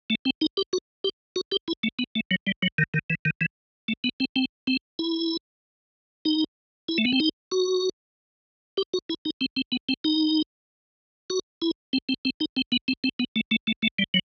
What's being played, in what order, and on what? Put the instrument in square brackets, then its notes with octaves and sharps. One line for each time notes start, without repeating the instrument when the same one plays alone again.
[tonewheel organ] A3
C4
D#4
G4
F#4
G4
F#4
G4
E4
A3
B3
A3
F#3
G3
F#3
D#3
D#3
E3
D#3
E3
A3
B3
C4
C4
C4
E4
D#4
E4
A3
B3
C4
D#4
F#4
G4
F#4
E4
D#4
C4
C4
B3
C4
D#4
F#4
E4
C4
C4
C4
D#4
C4
B3
C4
C4
B3
A3
A3
A3
A3
G3
F#3